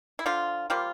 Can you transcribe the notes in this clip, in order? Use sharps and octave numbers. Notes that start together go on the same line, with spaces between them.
E4
D3 F3 F4
F3 G3 A#3 F4